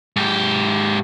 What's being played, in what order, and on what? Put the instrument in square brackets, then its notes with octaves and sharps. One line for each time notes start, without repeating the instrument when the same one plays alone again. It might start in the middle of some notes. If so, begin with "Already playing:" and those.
[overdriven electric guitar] G#2 G4